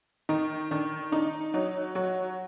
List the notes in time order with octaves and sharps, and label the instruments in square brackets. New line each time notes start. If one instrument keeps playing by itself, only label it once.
[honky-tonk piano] D#3 [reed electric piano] D#4
[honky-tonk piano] D#3 [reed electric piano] D4
[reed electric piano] D4 [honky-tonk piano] D#4
[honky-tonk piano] F#3 [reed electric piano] D#4
[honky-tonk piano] F#3 [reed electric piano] F#4